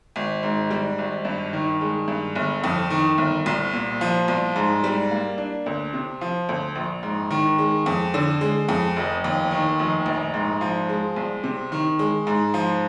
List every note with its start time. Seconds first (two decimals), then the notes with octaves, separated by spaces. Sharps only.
0.16 G#1
0.43 G#2
0.71 G3
0.99 G#1
1.25 G2
1.53 D#3
1.81 G#3
2.08 G2
2.36 G1
2.64 F2
2.90 D#3
3.18 G1
3.46 C2
3.73 A#2
4.01 F3
4.28 C2
4.56 G#2
4.84 G3
5.11 A#3
5.38 D4
5.66 D2
5.93 C3
6.21 F3
6.49 D2
6.76 A#1
7.03 G#2
7.31 D#3
7.58 G#3
7.86 F2
8.14 D3
8.41 G#3
8.69 F2
8.97 F1
9.24 D#2
9.51 D#3
9.79 F1
10.06 A#1
10.34 G#2
10.61 F3
10.89 G#3
11.16 C2
11.43 C3
11.72 D#3
11.99 G#3
12.27 G#2
12.54 F3